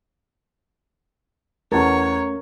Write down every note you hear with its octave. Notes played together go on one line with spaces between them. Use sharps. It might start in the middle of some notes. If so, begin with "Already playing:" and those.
E2 A3 C#4 A#4 C#5 A5